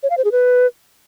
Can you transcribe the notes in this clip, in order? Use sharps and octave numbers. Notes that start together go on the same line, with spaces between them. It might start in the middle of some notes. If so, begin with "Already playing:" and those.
C#5
F5
C5
G#4
B4